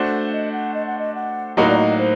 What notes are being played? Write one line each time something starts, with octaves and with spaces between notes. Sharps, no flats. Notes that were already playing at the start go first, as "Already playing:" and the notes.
Already playing: A3 D4 F#4 C5
F#5
D#5
F#5
D#5
F#5
D#5
F#5
A2 F#3 A#3 D#4 F#4 D#5
D5
D#5
C5